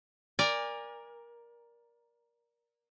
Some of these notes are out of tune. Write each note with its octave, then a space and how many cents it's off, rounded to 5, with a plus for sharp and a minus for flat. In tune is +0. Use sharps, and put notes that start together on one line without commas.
A#4 +15 D5 +0 G#5 -30